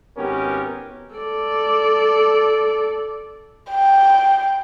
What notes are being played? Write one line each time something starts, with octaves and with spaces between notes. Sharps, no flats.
G#1 B3 C#4 G4 A#4
A4 D5
G5